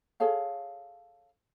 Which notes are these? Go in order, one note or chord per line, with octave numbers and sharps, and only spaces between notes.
G#4 A4 C#5 F5